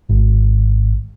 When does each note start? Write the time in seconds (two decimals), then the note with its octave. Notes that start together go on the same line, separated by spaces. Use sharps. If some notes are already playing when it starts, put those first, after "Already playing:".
0.09 G#1